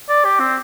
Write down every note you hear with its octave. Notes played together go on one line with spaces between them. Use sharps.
D5
G4
C4